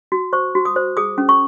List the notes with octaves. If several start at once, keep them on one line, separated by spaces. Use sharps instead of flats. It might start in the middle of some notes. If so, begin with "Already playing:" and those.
F#4
C5 C#6
F#4
D#6
C5
G#4 D#6
C#4
C#6